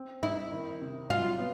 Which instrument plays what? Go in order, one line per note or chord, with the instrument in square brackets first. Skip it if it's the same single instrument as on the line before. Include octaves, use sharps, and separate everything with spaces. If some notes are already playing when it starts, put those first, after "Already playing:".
Already playing: [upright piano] C4
[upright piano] D#4 [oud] E4
[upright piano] D#3
C3
[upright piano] F#3 [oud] F4
[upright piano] B3